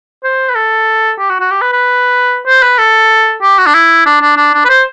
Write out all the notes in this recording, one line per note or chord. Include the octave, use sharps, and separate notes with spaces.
C5
B4
A4
G4
F#4
F#4
G4
B4
B4
C5
B4
A4
G4
F#4
D4
E4
D4
D4
D4
D4
B4
C5